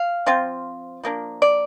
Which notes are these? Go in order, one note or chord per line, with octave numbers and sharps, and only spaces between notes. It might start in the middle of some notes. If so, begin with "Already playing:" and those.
Already playing: F5
F3 C4 F4
F3 A#3 D4
D5